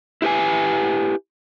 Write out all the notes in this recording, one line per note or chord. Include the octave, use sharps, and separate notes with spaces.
E4 G4 B4 G#5